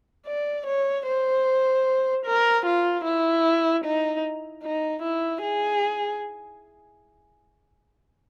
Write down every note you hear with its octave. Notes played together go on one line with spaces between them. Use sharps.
D5
C#5
C5
A#4
F4
E4
D#4
D#4
E4
G#4